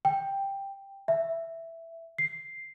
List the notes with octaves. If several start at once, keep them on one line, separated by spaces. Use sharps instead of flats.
G5
E5
C7